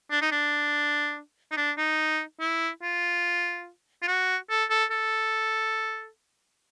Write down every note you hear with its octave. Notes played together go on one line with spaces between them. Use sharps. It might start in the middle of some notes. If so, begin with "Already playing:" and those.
D4
D#4
D4
D#4
D4
D#4
E4
F4
F4
F#4
A4
A4
A4